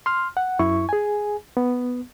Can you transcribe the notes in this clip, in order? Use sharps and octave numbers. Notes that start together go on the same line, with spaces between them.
C6 F6
F#5
F#2 E4 C#6
G#4 G#5
B3